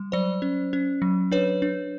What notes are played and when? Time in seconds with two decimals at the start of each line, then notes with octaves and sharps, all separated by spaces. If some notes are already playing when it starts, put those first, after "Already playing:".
Already playing: G3
0.12 F#3 C5 D5
0.42 C#4
0.73 C#4
1.02 F#3
1.32 D4 B4 C#5
1.62 D4